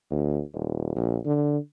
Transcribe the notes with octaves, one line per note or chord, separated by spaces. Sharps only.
D2
D#1
A#1
D3